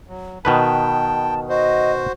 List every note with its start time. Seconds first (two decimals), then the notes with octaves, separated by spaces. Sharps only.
0.08 F#3
0.45 B2 D#3 B4 G5 A5
1.49 F#4 C5 D#5